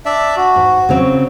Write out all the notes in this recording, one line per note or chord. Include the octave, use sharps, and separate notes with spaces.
D4 D5 E5
F#4
G#2
C#3 F#3 C4